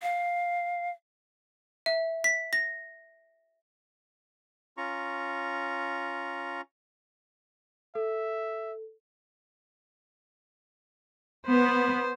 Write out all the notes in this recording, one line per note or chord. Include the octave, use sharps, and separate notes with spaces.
F5
E5
B6
A#6
C#4 F4 A#5 C#6
A4 E5
B3 C5